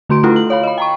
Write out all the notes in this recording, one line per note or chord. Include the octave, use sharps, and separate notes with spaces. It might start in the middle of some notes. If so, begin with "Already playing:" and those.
D3 A3 F#4 C6 D7
A3 D4 E4 F4 A4 B4
F#7
C#5 F5 B5
D#5 B5
G5 A#5 C#6